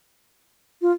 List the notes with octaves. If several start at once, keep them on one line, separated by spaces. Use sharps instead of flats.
F4